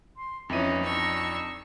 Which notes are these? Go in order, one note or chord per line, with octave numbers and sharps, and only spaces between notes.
C6
F2 E3 C#4 D#4 D#7
D4 C#6 E6